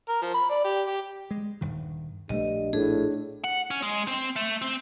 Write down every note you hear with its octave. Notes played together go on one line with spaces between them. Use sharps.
A#4
F3
B5
D5
G4
G4
G#3
D#1 G2 D#3
A#1 G2 G3 A3 D#5
A2 D4 G#4
F#5
C#4
G#3
C4
A3
C4